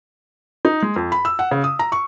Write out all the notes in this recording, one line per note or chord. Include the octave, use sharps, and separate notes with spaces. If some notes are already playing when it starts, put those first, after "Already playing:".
D#4
G#3
F2
B5
E6
F#5
C#3
D#6
A#5
C#6